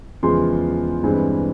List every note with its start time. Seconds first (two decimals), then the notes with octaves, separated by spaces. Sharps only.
0.23 E2 C#3 F3 G#3 C6
1.03 G2 E3 G#3 C4